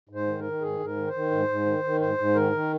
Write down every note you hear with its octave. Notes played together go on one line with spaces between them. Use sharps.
G#2
C5
D#3
A#4
D#3
G#2 G#4
G#2
A#4
D#3
C5
D#3
G#2
G#2
D#3
D#3
G#2 C5
G#2
D#3 A#4
D#3